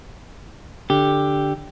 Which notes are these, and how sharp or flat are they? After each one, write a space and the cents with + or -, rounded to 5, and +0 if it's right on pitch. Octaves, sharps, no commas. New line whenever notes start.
D3 +0 G4 +0